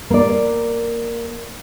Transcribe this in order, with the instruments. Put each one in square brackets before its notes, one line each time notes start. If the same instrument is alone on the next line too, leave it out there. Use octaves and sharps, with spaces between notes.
[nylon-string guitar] A#3 D5